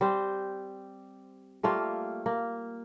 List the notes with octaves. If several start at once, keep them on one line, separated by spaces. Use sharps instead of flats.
G3 C4 C5
G3 A3 A#3 F4
A#3